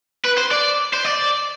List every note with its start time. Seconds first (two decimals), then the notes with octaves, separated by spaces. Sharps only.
0.25 B4
0.38 C5
0.51 D5
0.94 C5
1.05 D5